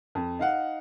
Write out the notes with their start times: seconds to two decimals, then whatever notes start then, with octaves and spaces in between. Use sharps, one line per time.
0.15 F2
0.39 D#4 F5 F#5